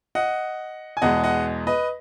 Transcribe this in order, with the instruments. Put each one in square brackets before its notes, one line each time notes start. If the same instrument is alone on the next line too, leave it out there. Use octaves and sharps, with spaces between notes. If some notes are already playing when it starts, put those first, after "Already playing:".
[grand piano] D#5 F#5
G#5
E2 B2 G#3 D#5 F#5
D#5 F#5
B4 D#5